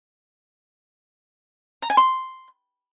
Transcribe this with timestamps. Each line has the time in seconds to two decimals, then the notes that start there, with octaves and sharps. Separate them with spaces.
1.82 A#5
1.90 G#5
1.97 C6